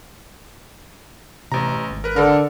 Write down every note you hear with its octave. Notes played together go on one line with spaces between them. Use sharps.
A1 C3 A#5
G#1
A#4 B4
D3 A4 A#4